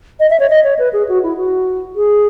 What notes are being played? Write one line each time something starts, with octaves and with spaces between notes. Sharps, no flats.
D#5
E5
C#5
D#5
C#5
B4
G#4
F#4
E4
F#4
G#4